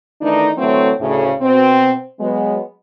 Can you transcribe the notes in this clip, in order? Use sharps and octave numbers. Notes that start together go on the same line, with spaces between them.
D#3 E3 A3 D4 D#4
D3 E3 F#3 A3 C4 C#5
D2 A2 C#3
B2 C4
F#3 G#3 B3